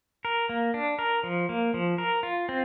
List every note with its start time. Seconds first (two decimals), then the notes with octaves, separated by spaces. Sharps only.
0.25 A#4
0.49 A#3
0.74 D4
0.99 A#4
1.24 F3
1.49 A#3
1.74 F3
1.98 A#4
2.23 F4
2.49 C4